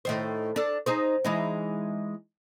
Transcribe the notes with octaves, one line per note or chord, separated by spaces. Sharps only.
A2 D#3 C5
D4 A4
D#4 G#4 C5
E3 G#3 D#4